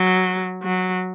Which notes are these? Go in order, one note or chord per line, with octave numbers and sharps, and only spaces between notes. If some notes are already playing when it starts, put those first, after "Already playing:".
Already playing: F#3
F#3